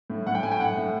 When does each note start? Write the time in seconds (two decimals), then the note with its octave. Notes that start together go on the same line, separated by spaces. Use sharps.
0.10 A2
0.27 A2 F#5
0.35 G5
0.43 A2 G#5
0.51 G5
0.60 A2 F#5
0.77 A2